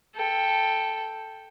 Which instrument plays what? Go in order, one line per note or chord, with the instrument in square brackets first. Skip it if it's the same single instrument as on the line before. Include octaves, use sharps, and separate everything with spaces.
[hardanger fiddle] A4 G5